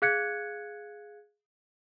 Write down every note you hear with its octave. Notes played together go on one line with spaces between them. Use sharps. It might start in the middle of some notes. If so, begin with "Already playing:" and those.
G#4 F5 F#6 G#6 C#7